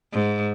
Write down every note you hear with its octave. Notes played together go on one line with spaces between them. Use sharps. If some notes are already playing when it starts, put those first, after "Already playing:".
G#2